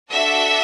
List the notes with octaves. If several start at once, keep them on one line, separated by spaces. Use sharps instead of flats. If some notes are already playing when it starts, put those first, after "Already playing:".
D4 F#4 A4 E5